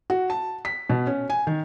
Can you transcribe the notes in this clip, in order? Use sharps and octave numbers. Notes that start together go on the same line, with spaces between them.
F#4
A5
B6
B2
C#4
G#5
D#3